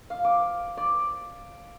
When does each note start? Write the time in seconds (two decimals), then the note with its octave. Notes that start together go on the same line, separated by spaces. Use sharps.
0.10 F5
0.24 D6
0.77 D5